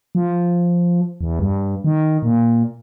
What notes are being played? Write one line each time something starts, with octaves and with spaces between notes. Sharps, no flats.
F3
E2
G2
D#3
A#2